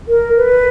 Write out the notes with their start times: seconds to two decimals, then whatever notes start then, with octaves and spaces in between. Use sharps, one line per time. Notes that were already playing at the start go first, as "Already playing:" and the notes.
0.08 A#4
0.37 B4